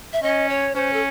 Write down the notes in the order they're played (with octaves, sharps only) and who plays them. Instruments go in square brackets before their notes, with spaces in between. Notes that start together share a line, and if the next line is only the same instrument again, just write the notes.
[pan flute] E5
[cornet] C#4 [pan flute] D#5
[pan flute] C#5
[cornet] C#4 [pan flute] C5
[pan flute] A4